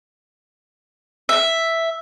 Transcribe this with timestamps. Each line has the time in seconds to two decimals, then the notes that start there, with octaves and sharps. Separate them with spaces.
1.29 E5